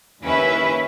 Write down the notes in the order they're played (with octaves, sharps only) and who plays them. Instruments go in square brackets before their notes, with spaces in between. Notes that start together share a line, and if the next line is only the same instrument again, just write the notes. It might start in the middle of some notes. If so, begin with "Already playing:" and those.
[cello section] D#2 C#4 E4 B4 E5